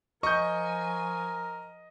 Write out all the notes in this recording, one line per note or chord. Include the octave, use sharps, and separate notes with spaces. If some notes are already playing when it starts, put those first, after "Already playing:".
F3 A#4 D#5 G#5 C#6 G6